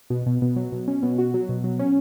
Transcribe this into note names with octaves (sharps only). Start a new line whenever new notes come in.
B2
B2
B2
F#3
B2
C#4
B2
F#4
F#3
B2
F#3
C#4